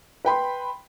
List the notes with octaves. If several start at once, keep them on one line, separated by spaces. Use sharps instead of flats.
B4 G5 B5 C6